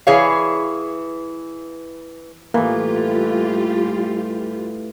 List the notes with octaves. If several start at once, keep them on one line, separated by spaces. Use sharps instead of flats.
E3 G#4 C#5 F5
A2 E3 G3 A#3 F4 G4